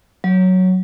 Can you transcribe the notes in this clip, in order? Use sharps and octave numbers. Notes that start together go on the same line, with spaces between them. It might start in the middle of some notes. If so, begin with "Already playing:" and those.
F#3